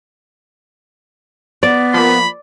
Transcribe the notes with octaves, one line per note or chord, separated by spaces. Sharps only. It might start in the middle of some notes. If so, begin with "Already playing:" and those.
B3 D5
F3 A#3 B5